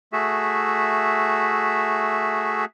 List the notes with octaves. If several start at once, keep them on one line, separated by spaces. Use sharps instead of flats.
A3 F#4 G#4 E5